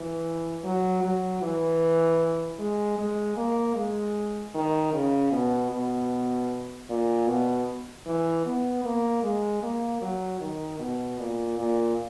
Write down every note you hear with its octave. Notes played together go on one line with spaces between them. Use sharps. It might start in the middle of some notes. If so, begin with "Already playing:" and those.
Already playing: E3
F#3
F#3
E3
G#3
G#3
A#3
G#3
D#3
C#3
B2
B2
A#2
B2
E3
B3
A#3
G#3
A#3
F#3
D#3
B2
A#2
A#2